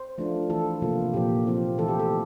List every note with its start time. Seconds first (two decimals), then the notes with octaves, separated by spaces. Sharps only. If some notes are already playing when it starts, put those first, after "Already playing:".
Already playing: C5
0.18 F3 A3 D4 F4
0.49 E3 A3 E4 A4
0.82 C3 F3 A#3 F4
1.14 A#2 F3 A#3 G4
1.47 F3 C4 F4
1.78 E3 A3 E4 A4
1.88 G4
2.00 A4